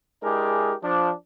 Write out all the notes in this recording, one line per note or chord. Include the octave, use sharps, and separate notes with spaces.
G#3 D4 E4 G4 G#4 A#4
F3 D4